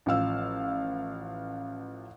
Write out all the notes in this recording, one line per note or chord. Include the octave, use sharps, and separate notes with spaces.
A1 F3 F5 E6